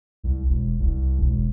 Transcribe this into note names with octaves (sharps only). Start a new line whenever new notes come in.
C2
E1
C2
E1